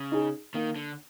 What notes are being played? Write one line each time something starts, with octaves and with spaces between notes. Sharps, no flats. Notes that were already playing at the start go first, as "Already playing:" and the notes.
Already playing: C#3
D#4 G#4
D#3 A#3
D3